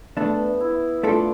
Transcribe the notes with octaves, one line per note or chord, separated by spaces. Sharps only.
A3 B3 D4 A4
E4
A3 D4 F4 A4